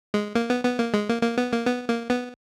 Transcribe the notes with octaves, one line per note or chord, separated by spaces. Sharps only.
G#3
A#3
B3
B3
A#3
G#3
A#3
A#3
B3
A#3
B3
A#3
B3